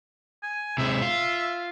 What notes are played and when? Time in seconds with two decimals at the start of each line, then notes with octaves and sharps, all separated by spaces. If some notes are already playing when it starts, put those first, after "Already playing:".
0.43 G#5
0.78 C3 G#3 E5
1.02 F4